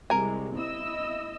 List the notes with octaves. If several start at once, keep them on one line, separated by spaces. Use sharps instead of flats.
C2 C3 G#3 A#4 G#5
E4 D#5 E6